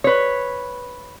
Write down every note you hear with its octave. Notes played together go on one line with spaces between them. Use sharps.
B4 C#5